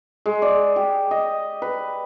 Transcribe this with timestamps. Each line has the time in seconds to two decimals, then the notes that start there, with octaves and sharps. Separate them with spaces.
0.26 G#3
0.42 D5
0.76 G4
1.11 D#5
1.62 B4